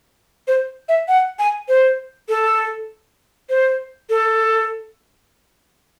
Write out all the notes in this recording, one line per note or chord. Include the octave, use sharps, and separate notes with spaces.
C5
E5
F#5
G#5
C5
A4
C5
A4